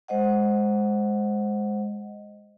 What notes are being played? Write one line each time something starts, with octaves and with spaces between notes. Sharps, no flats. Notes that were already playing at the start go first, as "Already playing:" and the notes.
G#3 C5 D#5 F#5